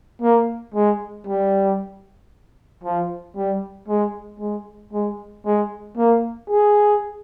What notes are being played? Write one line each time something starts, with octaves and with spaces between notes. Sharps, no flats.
A#3
G#3
G3
F3
G3
G#3
G#3
G#3
G#3
A#3
G#4